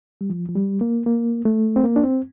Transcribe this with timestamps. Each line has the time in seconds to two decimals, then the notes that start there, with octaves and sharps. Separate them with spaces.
0.21 G3
0.30 F3
0.48 F3
0.55 G3
0.81 A#3
1.06 A#3
1.45 A3
1.76 C4
1.84 A#3
1.96 D4
2.03 C4